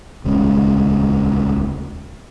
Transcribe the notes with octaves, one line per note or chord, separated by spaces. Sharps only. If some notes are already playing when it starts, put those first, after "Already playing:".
D#1 C#2 G#3 C#4